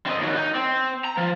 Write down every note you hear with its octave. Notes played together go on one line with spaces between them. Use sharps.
C4 D#5
D#2 F#3
D#4
C4
A#5
F3